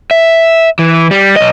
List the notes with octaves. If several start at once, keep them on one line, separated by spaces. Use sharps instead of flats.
E5
E3
G3
B1 D#5